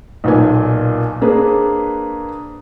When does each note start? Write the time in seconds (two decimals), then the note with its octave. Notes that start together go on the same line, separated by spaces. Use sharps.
0.24 B1 A#2 B4 G#5
1.21 A#3 D4 G#4 B4 C5